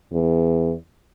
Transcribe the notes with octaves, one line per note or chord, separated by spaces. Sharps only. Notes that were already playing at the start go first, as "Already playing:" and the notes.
E2